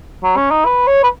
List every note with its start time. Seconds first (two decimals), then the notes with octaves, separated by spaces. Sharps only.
0.23 F#3
0.36 C#4
0.51 D#4
0.65 B4
0.87 C#5
1.03 B4